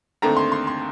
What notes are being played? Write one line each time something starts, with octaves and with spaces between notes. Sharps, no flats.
D#2 D3 A3 C4 A#5
C6
C6
C6